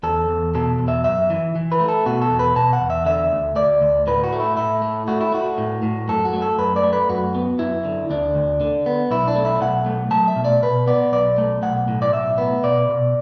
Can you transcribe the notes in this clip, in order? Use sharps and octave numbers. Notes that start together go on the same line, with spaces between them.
E2 A4
E2
B2 A4
E2
E5
F#2 E5
E3
E3
B4
A3
A4
B2 F#4
A4
E2
B4
B2 A5
F#5
E2
E5
D3 E5
D2
D2 D5
D2
A2 B4
F#4
A3
E4
A2 E4
A3
A3 F#4
E4
A3 F#4
A2
A2
F#2 A4
F#4
A3
A4
F#2 B4
D5
A3
B4
F#2 F#4
B3
F#2 E4
D3
D2 D4
D2
D3
B3
B1 E4
D4
A3
E4
B1 F#5
A3
F#3 A5
E5
B2
D5
B2 B4
B3 D5
B1 D5
A3
B1 F#5
A2
D5
B1 E5
B3
B2 D5
B2